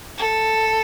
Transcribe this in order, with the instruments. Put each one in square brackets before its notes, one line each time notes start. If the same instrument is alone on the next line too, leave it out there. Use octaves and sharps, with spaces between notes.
[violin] A4